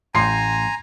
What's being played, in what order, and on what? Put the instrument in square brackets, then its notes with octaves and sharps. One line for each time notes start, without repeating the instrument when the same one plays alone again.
[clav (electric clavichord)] A1 G5 [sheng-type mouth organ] G#5 A#5 [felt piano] C6 C7